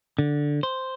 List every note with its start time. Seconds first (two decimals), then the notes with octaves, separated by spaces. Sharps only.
0.19 D3
0.63 C5